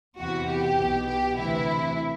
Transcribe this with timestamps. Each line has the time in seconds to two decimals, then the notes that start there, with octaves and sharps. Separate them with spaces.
0.18 E2 C3 E3 F#4
0.47 G4
0.77 B1 B2
1.07 G4
1.36 D2 C3 E3 E4